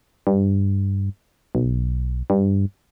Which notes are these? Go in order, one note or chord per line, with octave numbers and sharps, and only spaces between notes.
G2
B1
G2